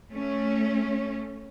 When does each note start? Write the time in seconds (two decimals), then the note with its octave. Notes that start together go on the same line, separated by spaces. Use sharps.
0.12 A3 C#4